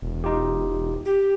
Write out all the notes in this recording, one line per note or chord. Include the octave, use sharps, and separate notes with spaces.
E1
D#4 F4 G4
G4